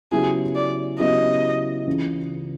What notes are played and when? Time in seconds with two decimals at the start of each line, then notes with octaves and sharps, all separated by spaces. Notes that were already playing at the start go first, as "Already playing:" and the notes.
0.11 C#3 F#3 B3 E4 G4 G#4
0.56 D5
0.99 C#3 F#3 B3 E4 G4 D#5
1.87 C#2 C#3 E3